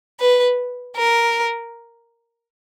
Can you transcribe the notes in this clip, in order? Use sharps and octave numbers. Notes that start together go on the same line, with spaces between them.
B4
A#4